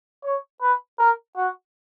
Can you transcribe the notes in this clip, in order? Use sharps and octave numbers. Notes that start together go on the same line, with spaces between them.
C#5
B4
A#4
F#4